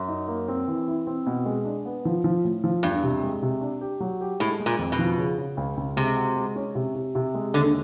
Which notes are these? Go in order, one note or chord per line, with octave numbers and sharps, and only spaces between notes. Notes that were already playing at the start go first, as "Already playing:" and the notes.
Already playing: F#2
D#4
A#3
C4
E3
E4
C4
B2
G#3
D4
B3
F3
F3
A2
F3
E2 G2
C3
G#3
C3
D4
G4
F#3
G4
A2 G#3
G#3
A#2
F2
B2
F3
C#3
C#3
C#2
C#2
C3 G#3
F#4
G#3
C#4
C3
C3
C3
G#3
D#2 D3